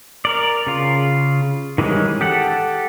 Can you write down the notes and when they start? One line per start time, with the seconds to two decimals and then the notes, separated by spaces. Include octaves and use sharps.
0.25 A#4 D5
0.67 C#3 F4
1.78 D#3 E3 G3 G#3 C#4
2.21 G4 A4 F#5